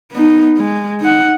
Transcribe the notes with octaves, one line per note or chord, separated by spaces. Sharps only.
B3 D#4
G#3
D#4 F#5